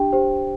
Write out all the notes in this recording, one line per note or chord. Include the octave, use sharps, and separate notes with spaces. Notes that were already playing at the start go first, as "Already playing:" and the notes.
Already playing: D4 G4 G5
G4 C5